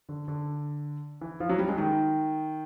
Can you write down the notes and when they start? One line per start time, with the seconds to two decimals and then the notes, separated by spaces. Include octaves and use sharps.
0.09 D3
0.28 D3
1.21 E3
1.40 F3
1.49 F#3
1.59 G3
1.68 G#3
1.78 D#3